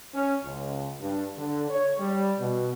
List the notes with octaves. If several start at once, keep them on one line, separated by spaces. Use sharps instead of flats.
C#4
C#2
G2
D3
C#5
G3
B2